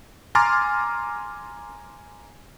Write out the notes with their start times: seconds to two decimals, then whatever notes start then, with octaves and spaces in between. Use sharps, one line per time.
0.35 G#5 A#5 C6 D6 F6 A6